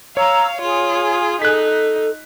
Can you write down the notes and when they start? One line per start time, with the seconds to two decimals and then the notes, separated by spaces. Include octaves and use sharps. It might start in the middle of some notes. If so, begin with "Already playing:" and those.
0.17 C#5 F5 A#5 E6
0.62 F4 G#4
1.42 D#4 A4 F#6 B6